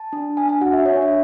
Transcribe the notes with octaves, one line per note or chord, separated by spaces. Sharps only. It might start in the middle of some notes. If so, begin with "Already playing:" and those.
Already playing: A5
D4
D4 G#5
G#5
F#4 F#5
E5
D4 C#5
E5